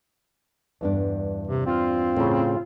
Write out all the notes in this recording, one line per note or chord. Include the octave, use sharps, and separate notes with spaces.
E2 G2 D4
C3
C4 F4
A2 C#3